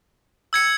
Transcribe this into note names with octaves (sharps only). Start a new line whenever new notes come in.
E6 G#6 C#7